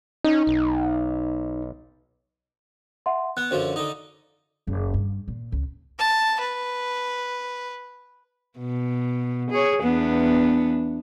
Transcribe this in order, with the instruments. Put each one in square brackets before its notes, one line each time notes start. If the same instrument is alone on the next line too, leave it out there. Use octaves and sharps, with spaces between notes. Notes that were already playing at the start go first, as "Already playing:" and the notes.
[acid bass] C#4 [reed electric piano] D#4
[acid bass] B1
[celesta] E5 F#5 C6
[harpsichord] B3 [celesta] F#6
[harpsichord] F#2 D3 F3 [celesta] C5
[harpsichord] D3 D#4 [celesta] D#6
[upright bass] F#1
G2
A#2
C#2
[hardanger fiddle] A5
B4
[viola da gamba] B2
G#4 C#5
E2 B3 D4